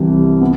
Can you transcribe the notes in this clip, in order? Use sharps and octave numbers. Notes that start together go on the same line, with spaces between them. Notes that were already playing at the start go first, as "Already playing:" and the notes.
Already playing: C2 C3 E3
B3